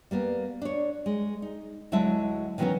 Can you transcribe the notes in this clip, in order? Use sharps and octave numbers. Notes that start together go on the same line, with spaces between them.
G3 A#3 B3
D4 C#5
G#3
D#4
D2 F#3 G#3 E4 E5 A5
D#3 E3 F#3 A3 B3 C#4